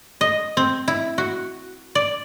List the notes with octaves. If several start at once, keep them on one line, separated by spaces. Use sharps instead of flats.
D#5
C4
E4
F#4
D5